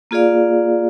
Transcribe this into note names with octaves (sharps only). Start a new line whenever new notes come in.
A#3 F4 G#4 D5 F5